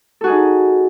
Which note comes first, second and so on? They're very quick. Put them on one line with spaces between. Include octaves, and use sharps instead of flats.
A4 F#4 G#4 D#4